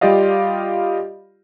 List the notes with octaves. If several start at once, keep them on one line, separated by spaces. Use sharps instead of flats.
G3 F4 G4 D5 D#5 F5